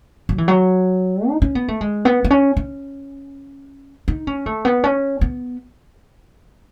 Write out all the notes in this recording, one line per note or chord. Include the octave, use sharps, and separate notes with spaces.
F#3
E3
F#3
D#4
C#4
B3
A3
G#3
B3
B3
C#4
C#4
D#4
C#4
A3
B3
C#4
B3